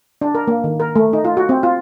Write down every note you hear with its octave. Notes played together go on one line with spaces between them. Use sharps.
D4
A#4
A#3
D#3
A#4
A3
D#4
F4
F#4
C4
F4